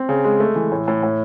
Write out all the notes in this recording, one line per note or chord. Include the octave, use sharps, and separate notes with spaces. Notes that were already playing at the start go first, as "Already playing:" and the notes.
Already playing: C4
C#3
G#3
A3
E3
A2
A2
A2